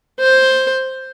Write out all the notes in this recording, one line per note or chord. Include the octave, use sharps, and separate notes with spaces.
C5